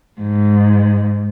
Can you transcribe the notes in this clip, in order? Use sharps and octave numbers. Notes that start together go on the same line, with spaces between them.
G#2